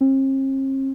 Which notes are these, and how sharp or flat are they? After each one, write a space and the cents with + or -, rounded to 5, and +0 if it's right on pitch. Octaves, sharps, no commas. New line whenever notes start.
C4 +45